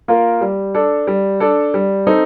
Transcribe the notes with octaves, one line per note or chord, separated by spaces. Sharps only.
A#3 F4 A#4
G3
D4 A4
G3
D4 A4
G3
C4 D#4 A4